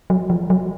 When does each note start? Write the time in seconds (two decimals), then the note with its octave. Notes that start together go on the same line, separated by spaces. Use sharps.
0.10 F#3
0.30 F3
0.50 F#3